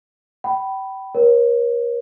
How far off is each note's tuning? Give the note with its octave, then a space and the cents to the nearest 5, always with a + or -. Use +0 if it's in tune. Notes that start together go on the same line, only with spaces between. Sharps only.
G5 -30 B5 +0
A#4 +35 C#5 -25